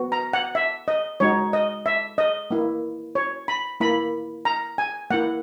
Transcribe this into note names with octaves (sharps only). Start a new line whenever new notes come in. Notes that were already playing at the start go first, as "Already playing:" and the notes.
Already playing: B3 F#4
A#5
F#5
E5
D#5
G#3 D#4 F#4 C#5
D#5
E5
D#5
A#3 E4
C#5
B5
A#3 E4 B5
A#5
G#5
A#3 E4 F#5